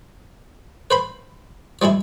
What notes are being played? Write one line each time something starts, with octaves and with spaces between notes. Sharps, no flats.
B4 C5 B5
F3 G3 G#3 E4